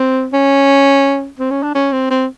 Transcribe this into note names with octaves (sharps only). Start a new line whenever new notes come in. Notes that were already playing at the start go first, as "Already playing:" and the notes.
Already playing: C4
C#4
C4
C#4
D4
C#4
C4
C4